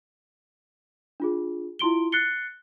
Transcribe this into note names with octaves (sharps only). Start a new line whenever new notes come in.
D4 F4 G#4
E4 F4 C6 D7 G7
F#6 A6 C7 C#7 G7